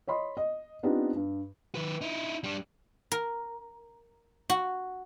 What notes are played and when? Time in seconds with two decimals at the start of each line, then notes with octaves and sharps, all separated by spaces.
0.07 C#5 D#5 B5 C6
0.37 D#5
0.83 B3 C4 D4 D#4 F4 G4
1.15 G2
1.75 D#3 B4
2.01 D#4 E4
2.44 G3 D4
3.12 A#4
4.50 F#4